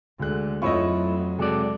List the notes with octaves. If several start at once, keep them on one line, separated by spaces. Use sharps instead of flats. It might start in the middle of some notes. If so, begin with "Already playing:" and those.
D2 D3 G#3 F#6
F2 F#3 A3 E4 F4 C#5 D#5 C#6
C3 G#3 F#4 A4 D5